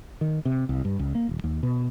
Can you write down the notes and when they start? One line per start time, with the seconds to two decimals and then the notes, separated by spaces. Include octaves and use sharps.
0.21 D#3
0.45 C3
0.69 C2
0.85 G2
0.99 C#2
1.15 A#3
1.29 D#1
1.44 D#2
1.63 B2